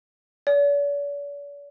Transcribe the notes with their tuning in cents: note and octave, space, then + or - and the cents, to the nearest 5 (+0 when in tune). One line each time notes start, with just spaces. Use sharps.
D5 -45